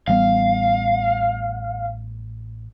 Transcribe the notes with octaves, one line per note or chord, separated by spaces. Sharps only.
A1 G3 B3 F5